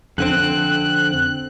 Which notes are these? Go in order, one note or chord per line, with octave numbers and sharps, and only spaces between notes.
F2 D3 C4 F#6